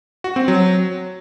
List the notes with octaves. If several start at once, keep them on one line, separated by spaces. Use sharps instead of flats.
F#4
C4
F#3